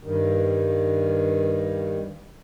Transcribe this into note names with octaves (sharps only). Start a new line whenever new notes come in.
G2 D#3